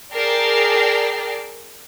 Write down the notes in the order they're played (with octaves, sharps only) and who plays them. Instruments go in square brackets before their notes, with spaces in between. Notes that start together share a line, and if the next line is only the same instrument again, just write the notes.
[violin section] G#4 A#4 D5 G5 A5 C7